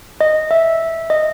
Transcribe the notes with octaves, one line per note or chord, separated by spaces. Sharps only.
D#5
E5
D#5